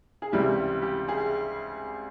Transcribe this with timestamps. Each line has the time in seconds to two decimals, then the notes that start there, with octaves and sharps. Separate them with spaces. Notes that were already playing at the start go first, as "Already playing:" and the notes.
0.22 G#4
0.32 C#2 C3 E3 G3 G4
0.82 G4
1.08 G#4